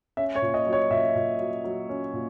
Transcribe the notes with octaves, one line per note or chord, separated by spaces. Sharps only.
C#4 E5
C#5
A#2
D#5
F#3
C#5
A#2 E5
A#2
F#3
F#3
C#4
A#2